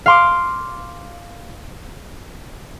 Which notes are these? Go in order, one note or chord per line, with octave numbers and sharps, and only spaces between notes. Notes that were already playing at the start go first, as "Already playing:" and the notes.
F5 C6 D6